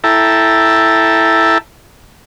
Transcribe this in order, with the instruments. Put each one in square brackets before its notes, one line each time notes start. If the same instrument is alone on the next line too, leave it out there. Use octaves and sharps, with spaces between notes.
[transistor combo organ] E4 A4 E5 G5 A5 A#5